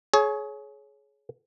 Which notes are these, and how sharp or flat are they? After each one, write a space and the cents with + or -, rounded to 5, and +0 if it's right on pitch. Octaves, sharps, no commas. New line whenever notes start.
G#4 +30 C#5 +0